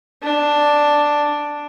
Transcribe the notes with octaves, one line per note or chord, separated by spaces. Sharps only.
D4